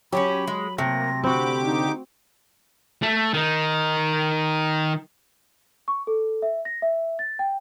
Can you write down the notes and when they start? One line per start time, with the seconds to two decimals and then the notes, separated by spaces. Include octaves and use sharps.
0.13 F#3 C#4 D4 G4 B5
0.47 G#3
0.78 C3 A3 A#3 A#6
1.24 D3 C4 F#4 G4 B5 D6
1.63 D#4
3.03 A3
3.34 D#3 D#4
5.88 C#6
6.07 A4
6.42 E5
6.65 A#6
6.82 E5
7.19 A6
7.39 G5